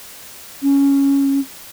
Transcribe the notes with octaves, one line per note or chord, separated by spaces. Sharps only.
C#4